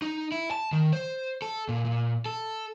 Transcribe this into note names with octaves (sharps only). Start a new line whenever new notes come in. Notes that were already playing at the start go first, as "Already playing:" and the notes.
D#4
E4
A5
D#3
C5
A4
A#2
A#2
A4